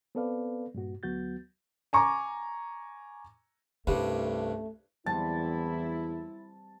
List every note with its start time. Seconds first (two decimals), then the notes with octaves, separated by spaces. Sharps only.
0.15 B3 C4 A4 B4 D5 F5
0.74 G2 A#2 F#4
1.03 D2 F#3 B3 F#4 G6 A6
1.93 G#5 A#5 C#6 D6
3.87 C2 G2 G3 A3 C4 C#4
5.06 E2 G3 C4 E4 A5